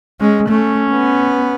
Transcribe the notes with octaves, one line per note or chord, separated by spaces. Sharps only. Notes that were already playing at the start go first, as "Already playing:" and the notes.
G#3 C#4
A3 C#4
B3